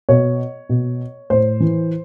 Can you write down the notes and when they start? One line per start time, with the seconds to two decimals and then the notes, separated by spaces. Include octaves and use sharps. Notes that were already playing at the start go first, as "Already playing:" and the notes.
0.09 B2 C#5
0.69 B2
1.30 A2 C5
1.60 E3